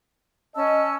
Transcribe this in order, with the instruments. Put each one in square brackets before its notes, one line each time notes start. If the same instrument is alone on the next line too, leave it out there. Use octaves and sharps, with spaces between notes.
[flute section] C#4 A5 E6 [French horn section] D#5